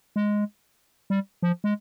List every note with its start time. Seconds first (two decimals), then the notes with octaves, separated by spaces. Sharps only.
0.16 G#3
1.10 G3
1.43 F3
1.64 G#3